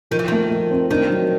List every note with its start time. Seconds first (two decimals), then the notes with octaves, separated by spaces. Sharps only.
0.11 D#3 F3
0.19 E3
0.28 D#3 A3
0.51 F3
0.71 C4
0.90 D#3 D4
1.09 F#3